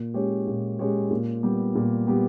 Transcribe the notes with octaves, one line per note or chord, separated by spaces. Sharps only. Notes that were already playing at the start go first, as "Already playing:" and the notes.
Already playing: A#2
G#3 C#4 G4 C#5
A#2
G#3 C#4 G4 C#5
A#2
G3 B3 G4
A#2
G3 B3 G4